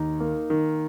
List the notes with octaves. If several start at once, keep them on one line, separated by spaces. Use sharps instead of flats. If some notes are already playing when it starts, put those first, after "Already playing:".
Already playing: D#2 D#4
A#3
D#3